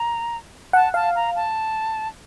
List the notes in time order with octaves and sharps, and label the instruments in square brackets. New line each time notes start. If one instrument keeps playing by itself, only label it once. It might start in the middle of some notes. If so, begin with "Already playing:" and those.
Already playing: [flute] A#5
[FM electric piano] F#5 [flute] A5
[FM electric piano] F5 [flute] A5
[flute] A#5
A5